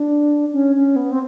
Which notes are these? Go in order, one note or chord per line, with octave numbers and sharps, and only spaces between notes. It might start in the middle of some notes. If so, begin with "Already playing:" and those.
Already playing: D4
C#4
C#4
B3
C4